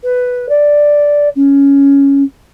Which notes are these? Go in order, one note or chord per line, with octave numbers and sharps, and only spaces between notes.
B4
D5
C#4